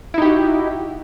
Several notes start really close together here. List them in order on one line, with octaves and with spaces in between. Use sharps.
E4 D#4 G4 F#4